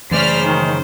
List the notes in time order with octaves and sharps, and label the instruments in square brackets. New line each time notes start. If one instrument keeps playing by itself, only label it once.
[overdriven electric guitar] F#2 C#3 [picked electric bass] E3 A3 [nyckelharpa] C5 [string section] D5 F6 B6
[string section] D#3